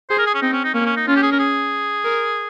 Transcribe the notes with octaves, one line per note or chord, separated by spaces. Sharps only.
G#4 C5
A#4
G#4
C#4
C4 D#4
C#4
D#4
A#3 C#4
C#4
D#4
C#4 F4
G4
G#4
A#4
G#4
A#4